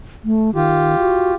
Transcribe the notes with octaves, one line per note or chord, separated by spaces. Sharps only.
A3
D#3 F4 G4
F#4